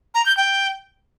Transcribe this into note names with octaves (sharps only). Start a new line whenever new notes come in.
A#5
G6
G5